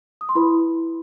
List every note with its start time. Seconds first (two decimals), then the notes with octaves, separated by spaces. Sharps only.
0.21 D#6
0.29 C6
0.35 E4 B4 B5